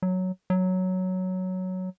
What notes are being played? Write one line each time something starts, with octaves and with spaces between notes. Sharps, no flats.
F#3
F#3